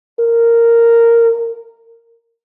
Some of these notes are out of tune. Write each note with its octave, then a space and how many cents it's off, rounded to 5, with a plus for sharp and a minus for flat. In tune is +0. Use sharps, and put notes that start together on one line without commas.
A#4 -10